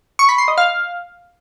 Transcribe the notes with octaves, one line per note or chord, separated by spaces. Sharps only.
C#6
B5
C6
D#5
F5